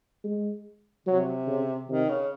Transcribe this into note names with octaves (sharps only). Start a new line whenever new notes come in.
G#3
C3 F#3
C#3
C3 D#3
C#3